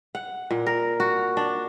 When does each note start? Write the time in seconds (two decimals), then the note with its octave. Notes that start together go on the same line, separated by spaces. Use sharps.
0.15 F#5
0.51 A#2
0.66 A#4
1.00 F#4
1.37 D4